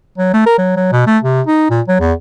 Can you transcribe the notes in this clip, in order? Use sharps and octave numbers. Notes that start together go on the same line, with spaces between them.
F#3
A3
A#4
F#3
F#3
B2
A3
C3
D#4
A#2
F#3
E2